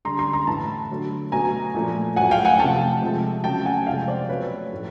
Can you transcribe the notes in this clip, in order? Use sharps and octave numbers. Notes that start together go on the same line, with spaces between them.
D3 G3 A#5 C6
A#5 C6
A#5 C6
A2 E3 A3 A5 B5
D3 F#3 A3
B2 F#3 A3 G#5 A#5
A#2 F3 A3
A2 F#3 A3 F#5 G#5
F5 G5
F#5 G#5
C3 F3 A3 G5 A5
C3 F3 G#3
C#3 F#3 A3 G5 A5
F#5 G#5
C3 F3 G#3 F5 G5
C5 D5
B2 F#3 A3 B4 C#5
A2 F3 A3